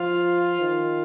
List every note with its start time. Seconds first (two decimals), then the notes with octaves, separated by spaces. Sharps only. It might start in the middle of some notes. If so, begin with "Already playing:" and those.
Already playing: F3 F4
0.61 D#3